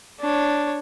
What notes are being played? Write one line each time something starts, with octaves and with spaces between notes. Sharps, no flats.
D4 C#5